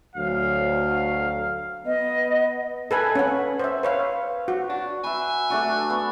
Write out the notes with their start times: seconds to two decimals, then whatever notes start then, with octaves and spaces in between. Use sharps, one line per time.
0.16 D2 F#3 F5
1.86 B3 D#5
2.91 A4 B4 G#5
3.15 C#4 F#5
3.60 C5 E5
3.83 B4 C#5 F5
4.48 F#4
4.70 D4 F#4
5.04 B4 E5 G#5
5.50 A3 D4 F#4
5.90 B3